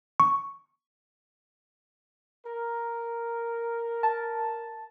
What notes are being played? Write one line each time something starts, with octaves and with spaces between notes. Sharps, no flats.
C#6
A#4
A5